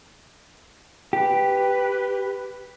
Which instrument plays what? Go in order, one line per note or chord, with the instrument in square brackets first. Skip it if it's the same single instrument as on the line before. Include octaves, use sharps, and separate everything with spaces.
[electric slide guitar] G4 [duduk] B4